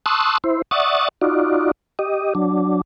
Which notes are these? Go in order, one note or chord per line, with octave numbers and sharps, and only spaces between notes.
A5 C6 C#6 D#6 E6 F#6
E4 C5
D5 E5 F#5 C#6 D#6 A6
D#4 F4 F#4 D5
G4 D#5
F#3 D4